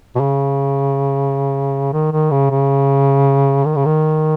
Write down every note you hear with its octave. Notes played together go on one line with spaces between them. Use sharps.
B2
C#3
D#3
D#3
C#3
C#3
D#3
C#3
D#3